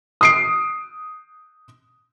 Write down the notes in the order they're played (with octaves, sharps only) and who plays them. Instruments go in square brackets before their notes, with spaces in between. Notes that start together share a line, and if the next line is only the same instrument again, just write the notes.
[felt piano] D#6 C7 D7